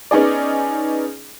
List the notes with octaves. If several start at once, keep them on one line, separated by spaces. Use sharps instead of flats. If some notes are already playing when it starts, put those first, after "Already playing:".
B3 C#4 D#4 G#4 D5